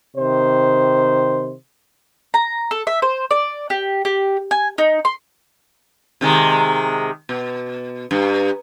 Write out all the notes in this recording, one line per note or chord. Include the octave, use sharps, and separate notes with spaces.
C3 D#3 C5
A#5
A4
E5
C5
D5
G4
G4
G#5
D#4
C6
C3 D#3 G#3
B2
G2